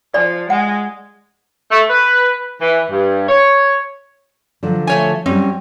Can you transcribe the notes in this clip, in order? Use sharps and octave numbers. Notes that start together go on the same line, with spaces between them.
F3 D5 G#5
G#3 F#5
A3
B4
E3
G2
C#5
D3 F3 F#3
A3 C#5 G#5
F#3 G3 C4 C#4